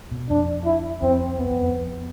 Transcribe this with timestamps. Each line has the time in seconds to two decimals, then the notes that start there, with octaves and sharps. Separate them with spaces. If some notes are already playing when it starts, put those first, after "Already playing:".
0.11 B2
0.29 F2 D4
0.65 E4
1.02 F2 C4
1.38 F2 B3
1.51 F2
1.63 F2